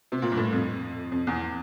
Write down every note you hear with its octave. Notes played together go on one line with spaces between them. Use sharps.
C3
A#2
G2
A2
F2
F2
E2